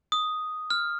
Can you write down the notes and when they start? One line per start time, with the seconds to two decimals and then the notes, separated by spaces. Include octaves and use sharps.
0.12 D#6
0.70 F6